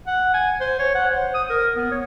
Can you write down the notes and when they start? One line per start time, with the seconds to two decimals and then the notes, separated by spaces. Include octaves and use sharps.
0.07 F#5
0.34 G#5
0.60 C5
0.79 C#5
0.95 F#5
1.11 C5
1.34 D#6
1.50 A#4
1.76 B3
1.92 C#5